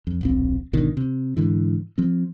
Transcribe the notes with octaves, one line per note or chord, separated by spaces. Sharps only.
F2
D1 A#1 C4
G#1 B2 D3 D#3
C3
G#2 D3 E3
F3 C4